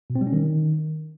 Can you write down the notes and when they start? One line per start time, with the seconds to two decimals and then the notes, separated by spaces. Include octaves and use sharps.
0.10 B2
0.15 C4
0.21 G3
0.27 C#4
0.33 D#3